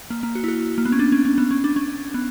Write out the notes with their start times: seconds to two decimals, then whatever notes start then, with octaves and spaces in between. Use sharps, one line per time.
0.10 A#3
0.23 A#3
0.35 F#4
0.44 E4
0.48 F#4
0.78 A#3
0.85 B3
0.92 C#4
0.99 D4
1.12 C#4
1.25 C#4
1.38 B3
1.51 C#4
1.64 D4
1.76 C#4
2.14 B3